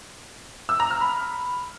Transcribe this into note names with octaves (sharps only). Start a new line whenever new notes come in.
E6
A#5
F6
B5